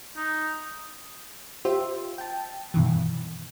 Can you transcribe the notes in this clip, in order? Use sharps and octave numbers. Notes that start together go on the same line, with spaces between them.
D#4
F4 G4 C5 E5
G5 A5
G2 B2 D#3 E3